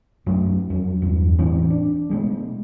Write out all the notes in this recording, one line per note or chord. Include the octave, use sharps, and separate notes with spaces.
F#2 F#3 A3
F2 F#3
E2 G2
E1 A2 E3 C4
D4
B2 G#3 A3